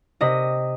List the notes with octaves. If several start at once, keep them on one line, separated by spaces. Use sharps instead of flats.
C3 D#5